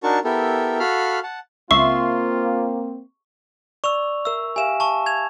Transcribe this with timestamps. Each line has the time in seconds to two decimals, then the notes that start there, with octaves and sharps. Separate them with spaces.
0.03 D4 D#4 F#4 A#4 A5 C#6
0.24 B3 E4 G4 A4 A#4
0.79 F#4 A4 F5 B5 F6
1.23 F#5 A5
1.71 C#2 A#3 C4 F4 E5 C6 C#6
3.84 D5 C#6 E6 F7
4.25 A#4 E5 E6
4.56 G4 E5 F5 G#5 E7
4.80 A5 C#6
5.06 G#6 F7